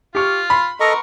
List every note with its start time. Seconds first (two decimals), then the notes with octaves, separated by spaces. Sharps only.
0.15 F4 G4 C#6 F6
0.50 B5 C6
0.80 B3 A4 A#4 D#5 A#5 C#6